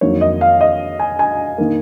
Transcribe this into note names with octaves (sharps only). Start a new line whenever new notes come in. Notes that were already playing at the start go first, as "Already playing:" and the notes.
F2 D#3 F#3 A#3 C#5
D#5
F5
D#5
G#5
G#5
D#3 A#3